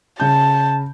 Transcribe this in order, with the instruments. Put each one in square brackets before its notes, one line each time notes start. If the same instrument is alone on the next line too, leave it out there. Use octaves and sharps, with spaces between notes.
[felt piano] C#3 G6 [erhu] A5